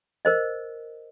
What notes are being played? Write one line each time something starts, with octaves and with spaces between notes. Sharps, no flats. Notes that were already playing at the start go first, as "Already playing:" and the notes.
A#4 C5 D#5